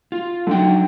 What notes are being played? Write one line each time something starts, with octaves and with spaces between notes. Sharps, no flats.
F4
D3 F#3 D#4 G5